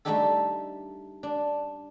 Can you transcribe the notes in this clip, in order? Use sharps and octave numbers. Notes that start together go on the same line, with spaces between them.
G3 A3 D4 D#4 G4 A4
D4